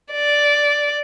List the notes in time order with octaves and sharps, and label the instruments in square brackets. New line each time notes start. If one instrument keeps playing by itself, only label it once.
[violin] D5